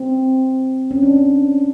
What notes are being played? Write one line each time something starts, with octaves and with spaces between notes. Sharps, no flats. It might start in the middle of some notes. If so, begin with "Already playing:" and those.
Already playing: C4
C#4
D4
C#4